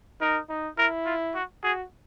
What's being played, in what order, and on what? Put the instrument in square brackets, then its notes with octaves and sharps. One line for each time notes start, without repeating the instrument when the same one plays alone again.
[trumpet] D#4 [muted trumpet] A#4
[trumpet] D#4
[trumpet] E4 [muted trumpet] A#4
[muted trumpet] F4
F#4
[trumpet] F#4 [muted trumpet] G#4